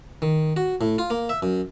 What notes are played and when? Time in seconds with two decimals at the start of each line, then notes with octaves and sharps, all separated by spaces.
0.22 D#3
0.56 F#4
0.81 A2
0.98 F4
1.10 A#3
1.29 E5
1.42 F#2